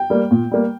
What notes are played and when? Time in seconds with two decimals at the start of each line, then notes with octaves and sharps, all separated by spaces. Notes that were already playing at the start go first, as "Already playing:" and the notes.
Already playing: G5
0.10 G3 A#3
0.31 A#2
0.51 G3 A#3